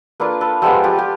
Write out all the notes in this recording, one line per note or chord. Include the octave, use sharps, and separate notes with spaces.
A#3 D4 F4 A4 B4
A4 B4
F3 G#3 B3 G4 A4
F4 G4
G4